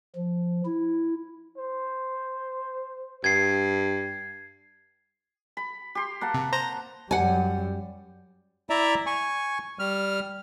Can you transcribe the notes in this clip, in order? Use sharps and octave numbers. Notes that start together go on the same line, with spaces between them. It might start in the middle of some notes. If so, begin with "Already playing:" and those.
F3
E4
C5
G2 G#6 C7
B5
G4 C6
A#3 F#5 A5
C3
C5 A#5 A#6
F#2 G3 F#5 G#5
E4 D5 E5 A#5
G#5 C#6
G3 F6